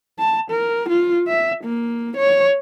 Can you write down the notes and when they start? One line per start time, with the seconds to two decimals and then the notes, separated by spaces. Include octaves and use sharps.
0.19 A5
0.51 A#4
0.89 F4
1.28 E5
1.64 A#3
2.17 C#5